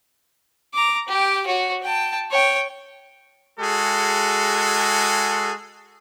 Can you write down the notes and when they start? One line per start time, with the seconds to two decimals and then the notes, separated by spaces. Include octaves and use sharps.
0.74 A#5 D6
1.08 G4 G5
1.47 F#4 C#5
1.83 G5 A5
2.32 C#5 G5
3.60 G#3 F#4 G#4 A4